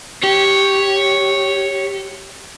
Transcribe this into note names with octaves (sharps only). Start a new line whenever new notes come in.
G4 C#5